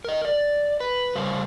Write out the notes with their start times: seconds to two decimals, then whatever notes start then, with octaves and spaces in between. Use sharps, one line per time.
0.05 A#4 D#5
0.25 D5
0.80 B4
1.15 C#3 G3 G4 A#4 C5 F5